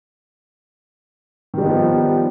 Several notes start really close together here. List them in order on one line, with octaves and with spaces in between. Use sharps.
D#3 G3 D#4 B3 F3